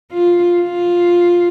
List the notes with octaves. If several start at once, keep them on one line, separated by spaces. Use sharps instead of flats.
F4
F4